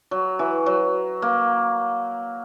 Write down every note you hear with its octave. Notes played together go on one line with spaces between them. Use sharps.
F#3
E3
F#3
A#3